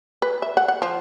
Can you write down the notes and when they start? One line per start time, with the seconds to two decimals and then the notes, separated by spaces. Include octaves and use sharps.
0.22 B4
0.42 E5
0.57 F#5
0.68 F#5
0.82 F3